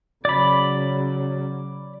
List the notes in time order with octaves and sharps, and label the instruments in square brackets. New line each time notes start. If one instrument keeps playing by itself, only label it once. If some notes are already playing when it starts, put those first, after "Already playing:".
[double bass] C#3 F#3 [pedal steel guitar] D5 B5